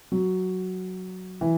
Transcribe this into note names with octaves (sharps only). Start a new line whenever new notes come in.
F#3
E3